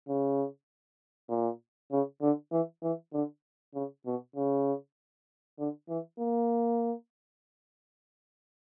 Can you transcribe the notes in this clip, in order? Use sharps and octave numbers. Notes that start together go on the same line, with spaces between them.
C#3
A#2
C#3
D3
E3
E3
D3
C#3
B2
C#3
D3
E3
A#3